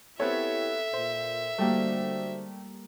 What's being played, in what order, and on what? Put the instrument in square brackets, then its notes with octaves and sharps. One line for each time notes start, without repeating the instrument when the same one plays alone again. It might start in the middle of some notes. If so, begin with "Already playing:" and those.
[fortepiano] B3 C4 C#5 [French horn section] E4 G4 [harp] A4 [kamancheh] E5
[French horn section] A#2 [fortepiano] C5
[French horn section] D3 F#4 C5 [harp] G3 A#3 [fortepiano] A3 G4